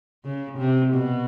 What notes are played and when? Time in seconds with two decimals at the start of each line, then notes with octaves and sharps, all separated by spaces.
0.24 C#3
0.58 C3
0.93 B2